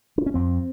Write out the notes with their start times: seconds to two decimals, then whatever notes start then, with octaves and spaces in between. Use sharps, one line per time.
0.18 D4
0.26 C#4
0.34 F2 C4